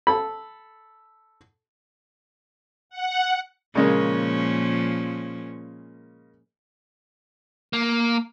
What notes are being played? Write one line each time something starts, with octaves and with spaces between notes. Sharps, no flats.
A4 B5
F#5
A#2 C#3 F3 G#3 A#3 C#4
A#3